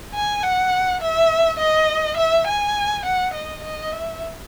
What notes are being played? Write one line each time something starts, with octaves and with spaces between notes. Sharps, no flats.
G#5
F#5
E5
D#5
E5
G#5
F#5
D#5
D#5
E5